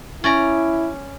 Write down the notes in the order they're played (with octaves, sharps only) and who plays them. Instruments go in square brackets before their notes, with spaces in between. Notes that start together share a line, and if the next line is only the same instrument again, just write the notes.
[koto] C#4 D5 A#5 [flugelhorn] E4